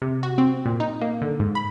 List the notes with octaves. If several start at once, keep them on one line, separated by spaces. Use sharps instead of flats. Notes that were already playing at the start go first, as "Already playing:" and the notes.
C3
F#4
C4
A#2
D#4
A#3
D3
G#2
B5